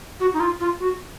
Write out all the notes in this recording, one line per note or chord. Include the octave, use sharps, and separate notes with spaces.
F#4
D#4
F4
F4
F#4